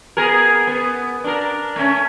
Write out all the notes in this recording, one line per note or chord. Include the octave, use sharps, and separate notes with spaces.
B3 G#4 A#4
B3
D4 A#4
A3 C#4